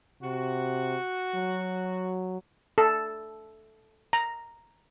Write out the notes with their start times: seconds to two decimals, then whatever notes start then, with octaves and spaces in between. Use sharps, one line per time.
0.22 C3 F#4
1.35 F#3
2.78 A4
4.13 A#5